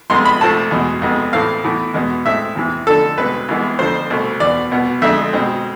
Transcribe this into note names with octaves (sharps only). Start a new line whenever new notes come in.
F2 C3 G#3 B3 C6
B5
C2 C3 F3 A3 C4 A5
E2 B2 G#3
F2 C3 G#3 B3
A2 E3 A3 C4 F5
A2 E3 B3
E2 B2 G#3 B3
A2 G#3 C4 E5
E2 C3 E3
F2 D3 F3 A4
C2 B2 G#3 C4 B4
C2 C3 E3 G#3 B3
F2 D3 F3 C5
C2 B2 A3
E2 B2 B3 D5
C2 B2 B3
F2 D3 G#3 E5
B2 G#3 C4